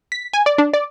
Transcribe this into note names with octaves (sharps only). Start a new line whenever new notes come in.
B6
G#5
D5
D4
D5